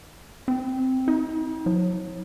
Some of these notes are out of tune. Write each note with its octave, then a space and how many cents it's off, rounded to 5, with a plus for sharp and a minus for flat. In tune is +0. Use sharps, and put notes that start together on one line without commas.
C4 -5
D#4 +45
F#3 -35